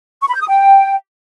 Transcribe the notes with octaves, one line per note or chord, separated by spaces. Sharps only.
C#6
B5
G6
D#6
G5